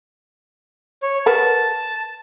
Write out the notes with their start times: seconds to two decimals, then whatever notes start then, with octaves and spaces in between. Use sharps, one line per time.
1.03 C#5
1.26 A#4 B4 F#5 A5